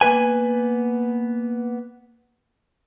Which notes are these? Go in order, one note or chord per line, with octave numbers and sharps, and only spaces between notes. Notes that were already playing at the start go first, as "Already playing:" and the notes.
A#3 B3 B4 G#5